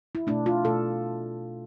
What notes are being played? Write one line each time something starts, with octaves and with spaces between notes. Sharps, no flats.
E4
B2 A3 D4
F4
B2 A3 A4